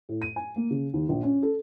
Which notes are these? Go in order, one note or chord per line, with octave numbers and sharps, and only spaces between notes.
A2
D#7
G#5
A#3
C#3
D#2
A#1
C#4
A4